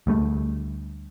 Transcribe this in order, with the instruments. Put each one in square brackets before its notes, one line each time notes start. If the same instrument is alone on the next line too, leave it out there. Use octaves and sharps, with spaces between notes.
[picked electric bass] D2 G3 A3